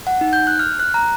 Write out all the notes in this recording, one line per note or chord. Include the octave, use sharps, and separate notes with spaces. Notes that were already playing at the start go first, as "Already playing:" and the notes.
F#5
D#4
G6
F#6
F6
F#6
A#5